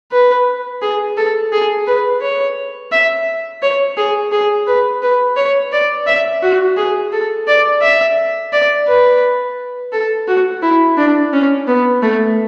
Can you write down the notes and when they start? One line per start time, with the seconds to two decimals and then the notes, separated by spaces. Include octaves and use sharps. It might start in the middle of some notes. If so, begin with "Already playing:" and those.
0.12 B4
0.82 G#4
1.17 A4
1.53 G#4
1.87 B4
2.22 C#5
2.92 E5
3.62 C#5
3.97 G#4
4.32 G#4
4.67 B4
5.02 B4
5.37 C#5
5.72 D5
6.07 E5
6.43 F#4
6.77 G#4
7.13 A4
7.48 D5
7.82 E5
8.53 D5
8.88 B4
9.92 A4
10.28 F#4
10.62 E4
10.98 D4
11.33 C#4
11.67 B3
12.02 A3